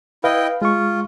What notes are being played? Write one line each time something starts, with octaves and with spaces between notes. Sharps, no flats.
E4 B4 D#5 F5 G5
G#3 F4 C#6